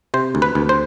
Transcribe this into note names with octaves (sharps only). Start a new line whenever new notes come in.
C3 C5
D2
B4
D2
C5